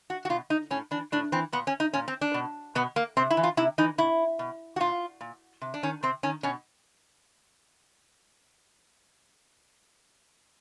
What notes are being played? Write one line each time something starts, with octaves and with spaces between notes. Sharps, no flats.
F#4
F#4
B2 F4
D#4
A2 C#4
E3 D4
A2 D4
E3 C4
A#2 B3
C#4
D#4
A#2 C#4
C4
D4
B2
B2 B3
A#3
C3 C4
E4
E3
F4
C3 E4
E3 D#4
B2 E4
B2
F#4
A#2 F4
A#2
C3
D4
D#3 C#4
C3 C4
D#3 C#4
B2 C#4